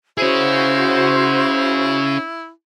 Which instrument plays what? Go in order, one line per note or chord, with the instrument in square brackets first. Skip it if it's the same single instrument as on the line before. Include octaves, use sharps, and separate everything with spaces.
[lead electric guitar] C#4 G#4 [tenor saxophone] E4 [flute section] F#4 C5